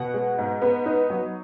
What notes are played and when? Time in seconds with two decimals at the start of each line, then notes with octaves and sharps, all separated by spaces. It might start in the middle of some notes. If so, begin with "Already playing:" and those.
Already playing: B2 F#5
0.14 G#3
0.38 G#2
0.62 B3
0.86 D#4
1.10 F#3